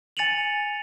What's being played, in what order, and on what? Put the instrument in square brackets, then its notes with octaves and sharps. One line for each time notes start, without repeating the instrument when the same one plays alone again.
[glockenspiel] G#5 A6 C#7 D#7 F7 F#7